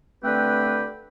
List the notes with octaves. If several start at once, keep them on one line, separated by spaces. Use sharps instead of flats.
D3 A3 C4 G4 B4